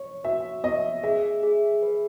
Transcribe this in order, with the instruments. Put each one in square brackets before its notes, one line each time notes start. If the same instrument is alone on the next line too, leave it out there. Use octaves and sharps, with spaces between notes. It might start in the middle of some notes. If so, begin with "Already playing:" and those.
Already playing: [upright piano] C#5
[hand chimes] F#4 [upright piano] E5
[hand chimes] B3 [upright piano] D#5
[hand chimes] G#4 [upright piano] E5
[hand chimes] G#4
B4